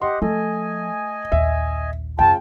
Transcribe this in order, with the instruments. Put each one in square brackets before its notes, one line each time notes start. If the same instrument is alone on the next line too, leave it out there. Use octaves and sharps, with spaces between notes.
[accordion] G4 D#5 F#5 [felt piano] C6
[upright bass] F3 [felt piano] A3 [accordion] D#5 G#5
[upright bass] A#1 D#2 [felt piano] E5
[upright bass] F#2 A3 [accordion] C#3 F4 [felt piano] G5 [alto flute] A5